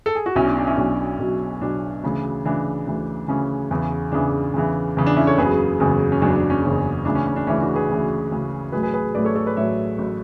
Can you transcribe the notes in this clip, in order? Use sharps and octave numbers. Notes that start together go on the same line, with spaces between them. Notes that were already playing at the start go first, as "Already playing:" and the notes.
A4
G#4
F#4
B1 B2 F#3 C#4 E4
D4
D4
C#4 E4
B1 B2 F#3 D4
B1 B2 F#3
B1 B2 F#3 D4
D2 C#3 E3
D2 C#3 E3 D4
D2 C#3 E3
D2 C#3 E3 C#4
E2 C#3 E3
E2 C#3 E3 D4
E2 C#3 E3
E2 C#3 E3
D4
C#4 E4
A4 C#5
F#1 E2 C#3 F#3 G#4 B4
F#1 E2 C#3 F#3
C#4
F#1 E2 C#3 F#3 D4
D4
C#4
F#1 E2 C#3 F#3
D2 C#3 E3 D4
C#4
C#4
D4
D2 C#3 E3 C#4 E4
D4 F#4
G#4 B4
D2 C#3 E3
D2 C#3 E3
A1 A2 F#3 G#4 B4
G#4 B4
G#4 B4
A1 A2 F#3 B4 D5
A4 C#5
A4 C#5
B4 D5
A1 A2 F#3 C#5 E5
A1 A2 F#3